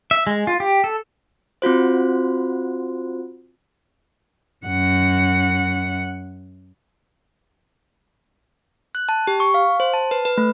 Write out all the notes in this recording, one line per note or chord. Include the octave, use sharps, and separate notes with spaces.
E5
G#3
F4
G4
A4
C4 F4 F#4 C5
F#2 F#5
F#6
A5
G4
C#6
F5
C5
A5
B4
B4
A3